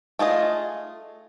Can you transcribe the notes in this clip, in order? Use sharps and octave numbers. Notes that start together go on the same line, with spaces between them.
A3 F4 G#4 D#5